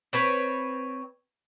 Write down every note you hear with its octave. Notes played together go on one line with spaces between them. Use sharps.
C4 B4 C#5